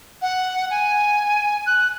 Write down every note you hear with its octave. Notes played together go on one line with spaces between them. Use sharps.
F#5
G#5
F#6